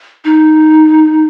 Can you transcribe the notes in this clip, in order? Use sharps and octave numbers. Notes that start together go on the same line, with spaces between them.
D#4